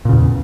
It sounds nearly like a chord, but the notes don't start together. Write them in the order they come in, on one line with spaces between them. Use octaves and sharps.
A#2 C#3 E2